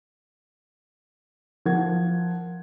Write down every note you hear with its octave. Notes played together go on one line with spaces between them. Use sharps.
F3 A#4 F#5 G#6